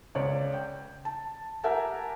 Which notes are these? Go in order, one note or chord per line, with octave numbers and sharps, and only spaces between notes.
C#2 C#5 D5
G5
A5
G4 A#4 E5 F#5 G#5 A5